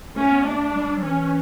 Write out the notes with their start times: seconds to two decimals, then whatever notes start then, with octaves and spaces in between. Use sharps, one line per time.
0.16 A3 C#4
0.31 B3
0.45 A3 D4
0.75 G3
0.97 F#3
1.03 E3 C#4